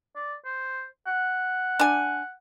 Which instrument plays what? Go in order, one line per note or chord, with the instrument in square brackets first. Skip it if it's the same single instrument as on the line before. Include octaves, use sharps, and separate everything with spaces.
[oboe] D5
C5
F#5
[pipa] D4 G#5